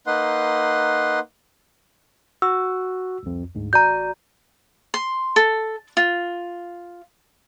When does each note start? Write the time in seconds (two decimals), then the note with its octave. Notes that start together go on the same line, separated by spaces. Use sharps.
0.07 A#3 D#4 B4 F#5 C6
2.42 F#4 E6
3.23 C2 F2
3.55 D2 G#2
3.73 A1 F#4 D5 A#5 G6
4.94 C6
5.36 A4
5.97 F4